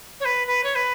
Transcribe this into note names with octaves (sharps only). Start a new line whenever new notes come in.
C#5
B4
B4
C#5
B4